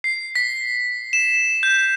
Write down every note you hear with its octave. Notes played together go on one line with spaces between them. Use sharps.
C7
B6
E7
G6